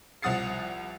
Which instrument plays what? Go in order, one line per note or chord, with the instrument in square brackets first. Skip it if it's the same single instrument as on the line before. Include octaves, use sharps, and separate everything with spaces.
[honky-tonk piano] C2 F3 F#5 D#6 A6 C7